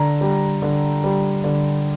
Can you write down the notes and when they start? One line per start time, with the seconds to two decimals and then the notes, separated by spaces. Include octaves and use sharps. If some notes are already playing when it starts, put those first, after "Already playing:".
Already playing: D3 A#5
0.21 G3
0.62 D3
1.04 G3
1.44 D3